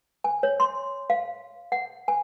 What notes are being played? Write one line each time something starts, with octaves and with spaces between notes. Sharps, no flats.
G#5
C#5
C6
F5
F#5
G#5